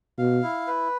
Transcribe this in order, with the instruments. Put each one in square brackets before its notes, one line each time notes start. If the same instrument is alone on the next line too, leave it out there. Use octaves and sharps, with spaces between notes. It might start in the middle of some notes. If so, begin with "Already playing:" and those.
[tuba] B2 [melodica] F5
[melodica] E4
B4